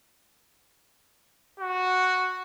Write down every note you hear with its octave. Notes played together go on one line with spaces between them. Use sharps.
F#4